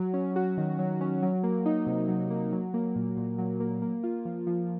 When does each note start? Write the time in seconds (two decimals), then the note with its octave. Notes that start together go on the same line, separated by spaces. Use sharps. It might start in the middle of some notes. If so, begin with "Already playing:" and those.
Already playing: F#3
0.14 C#4
0.36 F#4
0.58 D#3
0.79 F#3
1.01 C#4
1.23 F#3
1.43 A#3
1.66 D#4
1.87 C3
2.08 F#3
2.30 A#3
2.52 F#3
2.74 A#3
2.96 A#2
3.17 A#2
3.38 F#3
3.60 A#3
3.82 A#3
4.03 F4
4.25 F3
4.47 F3